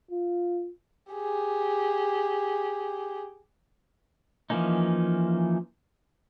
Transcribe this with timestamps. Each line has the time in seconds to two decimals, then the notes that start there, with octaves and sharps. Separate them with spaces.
0.11 F4
1.13 G4 G#4
4.50 E3 F3 A#3 C#4 D#4